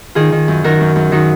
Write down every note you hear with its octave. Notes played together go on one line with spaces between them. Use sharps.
D#3 F4 G#4
D#3
F#2
D#3 F#4 A#4
F#2
F#2
D#3 D#4 F#4